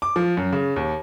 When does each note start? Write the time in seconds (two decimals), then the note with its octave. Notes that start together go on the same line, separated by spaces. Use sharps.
0.02 D6
0.16 F3
0.37 F#2
0.53 C#3
0.76 D#2